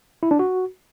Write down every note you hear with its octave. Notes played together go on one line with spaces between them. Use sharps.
E4
D4
F#4